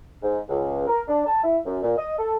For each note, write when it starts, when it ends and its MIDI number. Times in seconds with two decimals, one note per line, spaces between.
0.22 0.39 44
0.49 0.86 37
0.88 1.01 70
1.08 1.23 62
1.26 1.41 81
1.44 1.58 64
1.66 1.78 42
1.82 1.94 46
1.97 2.14 75
2.19 2.36 69